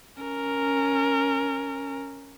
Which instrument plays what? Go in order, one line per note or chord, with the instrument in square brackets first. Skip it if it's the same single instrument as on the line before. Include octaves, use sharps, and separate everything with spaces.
[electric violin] C#4 A#4